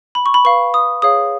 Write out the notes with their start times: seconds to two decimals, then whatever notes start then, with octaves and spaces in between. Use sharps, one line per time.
0.15 B5
0.26 C#6
0.34 B5
0.45 B4 F5 C#6
0.74 D#6
1.02 G#4 C#5 F5 D#6